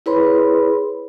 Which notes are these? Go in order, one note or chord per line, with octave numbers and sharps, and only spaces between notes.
E4 G#4 B4 C#5 B5 C6